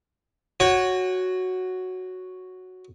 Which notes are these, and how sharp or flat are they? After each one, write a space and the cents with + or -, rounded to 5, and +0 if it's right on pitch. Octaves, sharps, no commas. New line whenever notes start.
F#4 +0 C#5 +0 G#5 -45